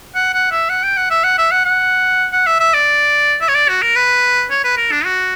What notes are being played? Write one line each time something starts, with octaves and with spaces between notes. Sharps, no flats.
F#5
F#5
E5
F#5
G5
F#5
E5
F#5
E5
F#5
F#5
F#5
E5
E5
D5
E5
C#5
D5
F#4
A#4
B4
C#5
B4
A#4
D4
F#4